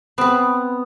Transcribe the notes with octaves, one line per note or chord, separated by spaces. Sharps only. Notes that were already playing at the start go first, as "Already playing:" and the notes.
B3 C4 B4